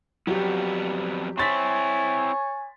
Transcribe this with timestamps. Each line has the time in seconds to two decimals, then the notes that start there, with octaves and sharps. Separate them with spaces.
0.27 F2 F#3 G3 B3 G4
1.38 C4 E4 C#5 G#5 C6 A6 B6